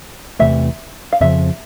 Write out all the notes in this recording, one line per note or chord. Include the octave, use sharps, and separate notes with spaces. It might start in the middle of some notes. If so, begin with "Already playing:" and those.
E2 C3 E3 A3 E5
F5
F2 C#3 F3 E5